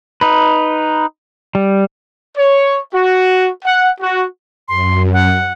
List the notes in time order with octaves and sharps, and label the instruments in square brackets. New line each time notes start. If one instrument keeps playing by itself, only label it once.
[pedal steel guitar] D#4 B4
G3
[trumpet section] C#5
F#4
F#5
F#4
[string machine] F#2 [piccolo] C6
[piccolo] F#5